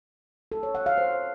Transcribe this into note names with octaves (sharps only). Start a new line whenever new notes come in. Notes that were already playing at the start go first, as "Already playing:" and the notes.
A4
C#5
F#5
F5
C5